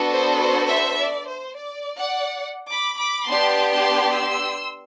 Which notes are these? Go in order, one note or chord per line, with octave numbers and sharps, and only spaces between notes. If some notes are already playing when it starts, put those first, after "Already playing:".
Already playing: B3 D4 F#4 A4
C5
C5
C5 E5
D5
C5
D5
D5 F#5
B5 D6
B5 D6
B3 D4 G4 A5 C6
A5 C6
C6 E6